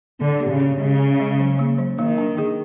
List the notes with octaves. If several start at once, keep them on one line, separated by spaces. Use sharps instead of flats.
D3 D4
G4
C#3
C#5
C#3 G#3
C#4
G#3
F#3
A#3
F#3
D#3 A#3
D4
G#4